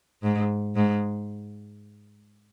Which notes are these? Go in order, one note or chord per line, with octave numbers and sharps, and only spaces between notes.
G#2
G#2